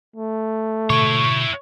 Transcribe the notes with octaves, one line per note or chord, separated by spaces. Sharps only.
A3
B2 D3 E4 C#5 C#6